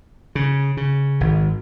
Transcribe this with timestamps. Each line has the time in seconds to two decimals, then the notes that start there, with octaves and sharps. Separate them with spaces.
0.35 C#3
0.77 C#3
1.21 G#1